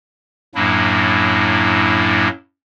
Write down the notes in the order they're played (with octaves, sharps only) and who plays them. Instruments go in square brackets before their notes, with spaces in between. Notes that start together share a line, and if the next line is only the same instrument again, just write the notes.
[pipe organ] F#2 A2 F#3 A#3 D4 E4